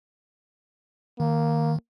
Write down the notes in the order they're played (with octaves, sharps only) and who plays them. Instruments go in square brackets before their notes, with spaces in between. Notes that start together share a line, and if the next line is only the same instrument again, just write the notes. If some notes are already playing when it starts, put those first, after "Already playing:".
[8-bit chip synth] D#3 [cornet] A#3